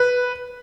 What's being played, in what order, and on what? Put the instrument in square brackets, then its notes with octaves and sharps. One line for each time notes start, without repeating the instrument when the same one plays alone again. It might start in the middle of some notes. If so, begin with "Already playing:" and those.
Already playing: [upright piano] B4